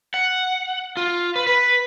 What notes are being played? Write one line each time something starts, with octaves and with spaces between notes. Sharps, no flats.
F#5
F4
B4
B4